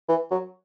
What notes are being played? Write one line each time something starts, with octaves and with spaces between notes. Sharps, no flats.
E3
F#3